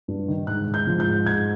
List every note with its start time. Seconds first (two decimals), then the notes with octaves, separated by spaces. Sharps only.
0.08 G2
0.28 D#3
0.47 G#2 F#6
0.67 G#2
0.74 G6
0.87 F3
1.00 G6
1.07 G#2
1.26 G#2 G#6